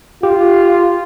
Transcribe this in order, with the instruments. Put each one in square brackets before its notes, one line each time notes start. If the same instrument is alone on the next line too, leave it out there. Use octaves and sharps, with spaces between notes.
[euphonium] F4 [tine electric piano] G4